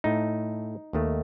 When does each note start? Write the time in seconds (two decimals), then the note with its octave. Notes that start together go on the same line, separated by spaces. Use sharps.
0.04 A2 A3 D#4
0.93 D#2 D#3 A3